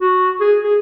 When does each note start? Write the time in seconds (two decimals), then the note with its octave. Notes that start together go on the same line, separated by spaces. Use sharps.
0.01 F#4
0.41 G#4
0.64 G#4